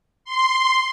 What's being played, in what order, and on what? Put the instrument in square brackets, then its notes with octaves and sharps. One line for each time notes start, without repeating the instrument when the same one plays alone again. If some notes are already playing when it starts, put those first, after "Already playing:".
[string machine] C6